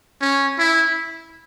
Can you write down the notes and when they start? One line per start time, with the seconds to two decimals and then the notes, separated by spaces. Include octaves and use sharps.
0.21 C#4
0.58 E4